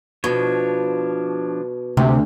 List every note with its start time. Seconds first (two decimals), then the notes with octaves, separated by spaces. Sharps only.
0.24 B2 F3 D4 C#5
1.97 D2 C3